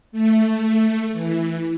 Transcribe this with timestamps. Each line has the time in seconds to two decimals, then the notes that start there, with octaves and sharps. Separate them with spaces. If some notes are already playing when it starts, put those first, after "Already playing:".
0.12 A3
1.12 E3